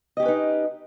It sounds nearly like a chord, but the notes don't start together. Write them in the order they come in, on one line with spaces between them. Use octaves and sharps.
D#5 G4 C#4 B4 D#4